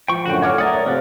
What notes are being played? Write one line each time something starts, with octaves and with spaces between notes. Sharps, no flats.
F3 G5 C#6
F#2 A2 D3 F#4 G5
C#5 F#5 D6 F6
A3 A#4 D5 F#5 D#6
C#5
C3 F3 A#4 B4 D5